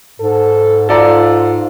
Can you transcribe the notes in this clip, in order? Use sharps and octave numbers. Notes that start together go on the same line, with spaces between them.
G#2 A4
F4 A4 D5 A#5